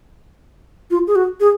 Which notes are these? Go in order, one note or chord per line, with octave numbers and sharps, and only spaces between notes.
F4
G#4
F#4
G#4